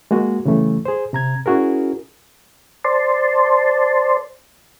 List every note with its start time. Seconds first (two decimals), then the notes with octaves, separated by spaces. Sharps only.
0.11 G#3 A#3 F#4
0.45 C#3 E3 G3 A3
0.85 G#4 C5
1.13 C3 A#5 G#6
1.46 C#4 E4 F#4 G#4 A#4
2.84 C5 D5 A5 C6